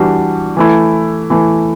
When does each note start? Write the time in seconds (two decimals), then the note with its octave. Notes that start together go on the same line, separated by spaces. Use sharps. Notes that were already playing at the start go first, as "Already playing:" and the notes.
Already playing: E3 G3 D4 F#4
0.57 E3 A3 E4
1.30 E3 A3 E4